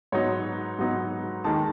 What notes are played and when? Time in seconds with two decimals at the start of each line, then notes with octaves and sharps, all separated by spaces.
0.12 G#2 F#3 B3 D#4 C#5
0.79 G#2 F#3 B3 D#4
1.44 D#2 D#3 G#3 D#4 A5